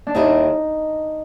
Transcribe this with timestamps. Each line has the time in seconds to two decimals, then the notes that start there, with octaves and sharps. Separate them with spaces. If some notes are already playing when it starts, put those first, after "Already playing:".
0.07 D4
0.14 D#2 D#3 G3 C4 D#4 E4